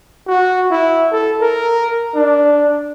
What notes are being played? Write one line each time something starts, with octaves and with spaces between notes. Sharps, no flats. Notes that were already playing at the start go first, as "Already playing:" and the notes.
F#4
E4
A4
A#4
D4